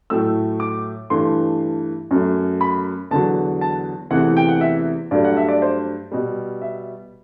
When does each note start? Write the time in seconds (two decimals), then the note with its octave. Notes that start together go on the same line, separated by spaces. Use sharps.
0.10 A2 F#3 A3 E6
0.60 D6
1.10 G2 E3 A3 C6
2.11 F#2 F#3 A3
2.61 B5
3.11 E2 D3 F#3 A5
3.61 A5
4.11 E2 C3 E3 A3 F#5
4.37 G5
4.49 F#5
4.61 E5
5.11 G2 F#3 A3 D5
5.24 F#5
5.37 E5
5.48 D5
5.62 C5
6.11 B2 G3
6.62 E5